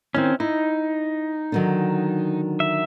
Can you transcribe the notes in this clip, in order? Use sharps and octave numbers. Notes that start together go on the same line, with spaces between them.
D#3 C4 C#4 E4
D#4 E4
D3 D#3 F#3
E5